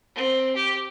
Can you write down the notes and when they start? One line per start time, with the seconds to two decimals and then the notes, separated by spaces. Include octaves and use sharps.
0.15 C4
0.56 G4